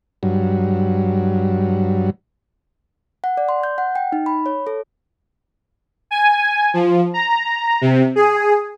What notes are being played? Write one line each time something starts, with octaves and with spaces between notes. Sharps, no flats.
G2 F#3
F#5
D5
C6
G6
F#5
G5
D#4
B5
C#5
A4
G#5
F3
A#5
C3
G#4